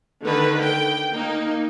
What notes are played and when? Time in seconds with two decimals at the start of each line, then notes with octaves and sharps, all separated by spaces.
0.23 D3 D#3 B4
0.62 G5
1.12 A#3 D#4